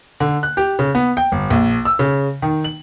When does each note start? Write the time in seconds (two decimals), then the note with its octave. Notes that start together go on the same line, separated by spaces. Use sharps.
0.20 D3
0.43 F#6
0.57 G4
0.79 C#3
0.95 B3
1.17 G5
1.32 G1
1.50 A#1
1.85 E6
1.99 C#3
2.42 D#3
2.64 F#7